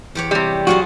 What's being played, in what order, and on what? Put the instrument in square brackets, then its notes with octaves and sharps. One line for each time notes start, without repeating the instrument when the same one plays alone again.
[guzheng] E2 G4 C#5
[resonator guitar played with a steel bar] C3 G3
[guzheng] F#3 F4 G#4 [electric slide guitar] F#4